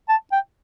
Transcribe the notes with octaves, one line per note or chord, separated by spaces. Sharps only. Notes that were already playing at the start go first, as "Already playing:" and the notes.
A5
G5